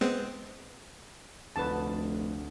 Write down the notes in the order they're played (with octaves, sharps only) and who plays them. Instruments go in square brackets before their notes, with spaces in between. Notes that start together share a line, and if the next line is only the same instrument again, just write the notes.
[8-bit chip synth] G#3 B3 C4
[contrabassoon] F1 [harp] D2 [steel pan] B4 A5